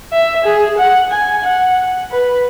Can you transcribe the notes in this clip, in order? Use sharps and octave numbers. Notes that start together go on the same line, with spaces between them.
E5
G#4
F#5
G#5
F#5
B4